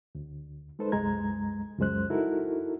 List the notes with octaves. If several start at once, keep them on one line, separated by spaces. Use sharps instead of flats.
D2
G#3 D#4 A4 B4 C5
C2 F#2 G#3 A#5 G#6
C#2 F#2 G#3 C5 F#6
D#4 E4 F#4 A4 A#4